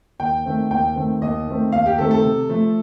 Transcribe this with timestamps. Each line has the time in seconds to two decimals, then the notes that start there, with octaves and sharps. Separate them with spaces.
0.19 D#2 G5
0.46 D#3 A3 C4
0.71 D#2 G5
0.96 D#3 A3 C4
1.22 D#2 D#5
1.47 D#3 A3 C4
1.72 D#2 F5
1.86 G4
1.98 D#3 A3 C4 A4
2.11 A4
2.24 C3
2.49 F3 A3